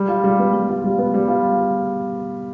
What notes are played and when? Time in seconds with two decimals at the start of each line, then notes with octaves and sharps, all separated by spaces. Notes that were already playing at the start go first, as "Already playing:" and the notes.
Already playing: G3
0.08 F4
0.24 G3
0.39 B3
0.53 G3
0.69 F4
0.84 G3
0.99 B3
1.14 G3
1.28 F4